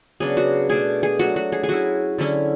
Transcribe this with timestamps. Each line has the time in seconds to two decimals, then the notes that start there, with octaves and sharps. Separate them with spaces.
0.20 C#3 F#3 B3 D4 G#4
0.37 F#4
0.70 B2 A3 D4 G#4
1.03 G#4
1.19 F#3 A3 D4 F#4
1.36 F#4
1.52 G#4
1.63 G#4
1.69 F#3 C#4 E4 F#4
2.18 D3 F#3 C#4 E4